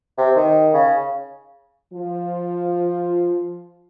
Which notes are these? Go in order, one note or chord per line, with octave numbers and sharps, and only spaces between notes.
C3
D#3
C#3
F3 F4